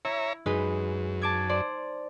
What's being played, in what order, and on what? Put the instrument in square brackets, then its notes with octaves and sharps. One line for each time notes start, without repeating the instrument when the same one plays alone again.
[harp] E4 [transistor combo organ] C#5 E5 A#5
[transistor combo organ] F#2 [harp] G#3 D#4 B4
[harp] A5 D6 G#6
C5 D5